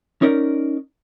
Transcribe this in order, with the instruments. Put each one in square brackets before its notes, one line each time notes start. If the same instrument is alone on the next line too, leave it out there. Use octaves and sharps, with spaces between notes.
[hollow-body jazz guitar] C#4 D#4 A#4 D5